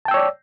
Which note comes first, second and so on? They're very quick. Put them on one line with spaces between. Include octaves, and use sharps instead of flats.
A5 G5 E6 C#5 D5